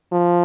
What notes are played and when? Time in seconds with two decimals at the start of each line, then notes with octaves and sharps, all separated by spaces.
0.12 F3